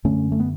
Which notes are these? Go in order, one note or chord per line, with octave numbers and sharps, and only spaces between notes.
F#2 D3 A3 C#4
A3
B3